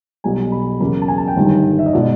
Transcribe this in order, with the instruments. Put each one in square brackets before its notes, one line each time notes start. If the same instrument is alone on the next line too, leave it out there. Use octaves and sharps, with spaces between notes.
[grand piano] B1 B2 G3 G#5
B5
E2 C#3 F#3 A#3 B5
A5
G#5
A5
G5
G1 G2 D#3 G3
E5
D#5
B2 G#3 D5